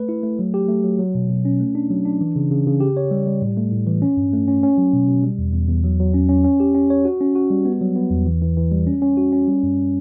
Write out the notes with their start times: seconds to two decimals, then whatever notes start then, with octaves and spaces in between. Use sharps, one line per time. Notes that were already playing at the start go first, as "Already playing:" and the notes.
Already playing: A3 B4
0.09 E4
0.23 A3
0.39 F#3
0.54 G4
0.69 A3
0.84 F#3
0.99 F#3
1.15 B2
1.29 B2
1.45 C#4
1.60 A3
1.75 D4
1.90 F#3
2.05 D4
2.21 E3
2.36 C#3
2.51 C#3
2.66 C#3
2.81 G4
2.97 C#5
3.11 G3
3.27 G3
3.42 A2
3.57 A3
3.72 A2
3.87 E3
4.02 C#4
4.17 G2
4.33 A3
4.48 C#4
4.63 C#4
4.78 F#3
4.93 B2
5.08 B2
5.23 G3
5.38 E2
5.53 E2
5.69 E2
5.84 F#3
6.00 F#3
6.14 C#4
6.29 C#4
6.44 C#4
6.60 G4
6.74 C#4
6.90 C#5
7.05 F#4
7.21 C#4
7.35 F#4
7.50 G3
7.65 B3
7.81 F#3
7.96 B3
8.11 E2
8.26 E3
8.42 E3
8.57 E3
8.71 G3
8.87 C#4
9.02 C#4
9.17 F#4
9.32 C#4
9.48 G3
9.63 F#2